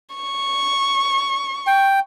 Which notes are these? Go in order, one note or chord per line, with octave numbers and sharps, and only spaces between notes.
C#6
G5